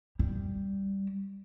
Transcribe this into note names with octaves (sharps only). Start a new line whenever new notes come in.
G3